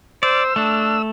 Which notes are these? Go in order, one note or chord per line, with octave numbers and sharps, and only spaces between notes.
C5 D5 E6
A3 D4